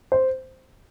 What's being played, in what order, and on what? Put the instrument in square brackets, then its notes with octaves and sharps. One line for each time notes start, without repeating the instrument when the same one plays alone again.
[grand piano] C5